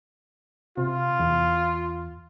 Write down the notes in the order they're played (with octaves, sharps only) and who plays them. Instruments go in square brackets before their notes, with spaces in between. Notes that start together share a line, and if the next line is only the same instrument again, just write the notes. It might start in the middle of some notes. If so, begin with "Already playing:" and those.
[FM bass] C3 [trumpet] F4
[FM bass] E2